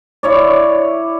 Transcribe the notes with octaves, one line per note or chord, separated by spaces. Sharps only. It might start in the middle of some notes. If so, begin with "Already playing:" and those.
E4 C#5 D5